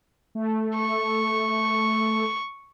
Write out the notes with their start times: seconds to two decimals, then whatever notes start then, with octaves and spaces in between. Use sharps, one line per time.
0.35 A3
0.75 C#6